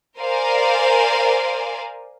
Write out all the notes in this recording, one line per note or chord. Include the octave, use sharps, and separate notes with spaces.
A#4 C5 D5 F5 G#5